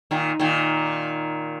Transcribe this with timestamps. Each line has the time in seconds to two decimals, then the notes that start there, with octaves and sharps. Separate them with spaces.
0.11 A#2 D#3
0.40 A#2 D#3